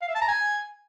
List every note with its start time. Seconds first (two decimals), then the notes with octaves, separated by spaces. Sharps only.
0.02 F5
0.08 E5
0.15 A5
0.22 A#5
0.28 G#5